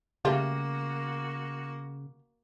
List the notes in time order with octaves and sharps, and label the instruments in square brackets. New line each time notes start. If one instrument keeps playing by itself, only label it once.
[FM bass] C#3 [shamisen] G3 A3 F4 [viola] A#3 F#4